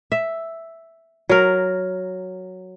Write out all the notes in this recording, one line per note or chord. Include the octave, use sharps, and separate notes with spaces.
E5
F#3 A#4